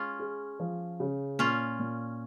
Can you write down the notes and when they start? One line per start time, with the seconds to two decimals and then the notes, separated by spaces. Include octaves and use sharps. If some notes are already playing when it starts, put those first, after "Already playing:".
Already playing: G#3 C#4 F4
0.19 G#4
0.60 F3
1.00 C#3
1.39 A#2 C#4 F4
1.79 A#2